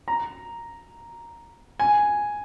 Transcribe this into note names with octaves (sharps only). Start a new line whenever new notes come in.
A#5
G#5